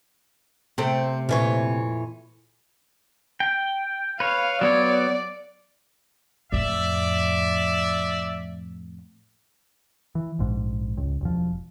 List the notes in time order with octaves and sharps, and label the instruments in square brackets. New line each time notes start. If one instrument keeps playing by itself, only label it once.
[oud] C3 A3 [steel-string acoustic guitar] C4
[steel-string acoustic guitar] F2 E3 C#5 [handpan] A#2
[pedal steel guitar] G5
[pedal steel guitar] B4 C#5 [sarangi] F5
[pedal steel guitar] F#3 B3 C#5 [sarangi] D5
[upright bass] F2 A2 [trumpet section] D5 E5
[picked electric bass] E3
A#1 G#2
C#2
E1 F3